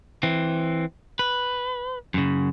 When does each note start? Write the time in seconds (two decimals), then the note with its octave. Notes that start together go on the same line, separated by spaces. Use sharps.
0.23 E3 C4
1.19 B4
2.14 F#2 C#3